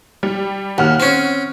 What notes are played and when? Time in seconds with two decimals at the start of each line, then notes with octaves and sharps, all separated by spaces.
0.23 G3
0.78 D#2 F#5 F6
1.00 C4 C#4